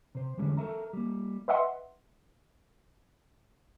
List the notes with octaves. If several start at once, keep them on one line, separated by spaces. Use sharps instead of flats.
C3 C5
E2 D3 G3 G#3 C#4
A4 A#4 E5 A#5
G3 A#3
B4 D#5 E5 F#5 C6